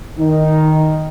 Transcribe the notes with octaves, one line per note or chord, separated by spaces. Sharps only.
D#3 D#4